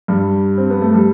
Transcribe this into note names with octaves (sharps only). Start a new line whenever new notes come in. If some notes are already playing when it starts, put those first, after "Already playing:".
G2 G3
C4
B3
A3
G3